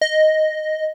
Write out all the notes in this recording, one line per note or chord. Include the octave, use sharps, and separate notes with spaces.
D#5